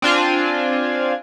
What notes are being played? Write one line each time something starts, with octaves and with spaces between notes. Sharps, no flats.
C4 D4 F4 G#5